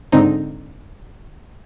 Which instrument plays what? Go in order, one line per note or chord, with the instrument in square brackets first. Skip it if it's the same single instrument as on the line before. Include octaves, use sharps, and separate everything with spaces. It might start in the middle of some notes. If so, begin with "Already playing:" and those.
[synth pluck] G#2 D3 C4 D#4